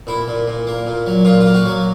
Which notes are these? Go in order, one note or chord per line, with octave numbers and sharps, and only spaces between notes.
A#2 E4
A#2
A#2
A#3
A#2
F#3
A#2 F4
F4
A#3
F#4
F#3